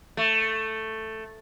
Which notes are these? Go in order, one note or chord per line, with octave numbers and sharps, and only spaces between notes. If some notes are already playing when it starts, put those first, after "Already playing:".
A3